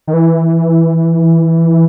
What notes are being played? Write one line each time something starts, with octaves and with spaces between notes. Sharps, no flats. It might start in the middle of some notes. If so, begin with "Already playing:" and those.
D#3
E3